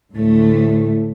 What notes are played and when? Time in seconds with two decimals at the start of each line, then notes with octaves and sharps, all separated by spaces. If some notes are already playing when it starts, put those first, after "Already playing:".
0.15 D2 A2 A3